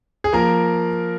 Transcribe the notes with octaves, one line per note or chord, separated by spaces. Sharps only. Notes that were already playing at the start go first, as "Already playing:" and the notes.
G#4
F3 A#3 A#4